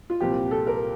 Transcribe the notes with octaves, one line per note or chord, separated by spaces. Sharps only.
F4
C2 A#2 F3 G4
A4
A#4